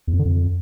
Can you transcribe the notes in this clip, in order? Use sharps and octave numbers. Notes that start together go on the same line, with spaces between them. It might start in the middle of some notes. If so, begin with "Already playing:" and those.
E2
F2
D3
F2